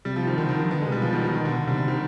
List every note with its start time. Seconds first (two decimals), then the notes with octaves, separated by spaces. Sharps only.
0.05 C3 G3
0.16 F3
0.27 D#3
0.37 D3 D#3
0.46 C3
0.49 D#3
0.59 D#3
0.62 F3
0.70 D#3 B3
0.78 D3
0.81 G#3
0.86 C3
0.92 B2 G3
1.02 F3
1.13 D#3
1.24 D#3
1.35 D#3
1.45 D3
1.56 D#3
1.67 C3 G3
1.77 G3
1.88 D#3